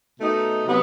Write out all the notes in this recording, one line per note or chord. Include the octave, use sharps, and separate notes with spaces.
B2 A3 D#4
C3 F#3 B3